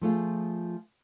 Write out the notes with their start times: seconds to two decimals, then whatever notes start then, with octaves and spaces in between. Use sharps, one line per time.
0.01 F3 A3 F4 G#4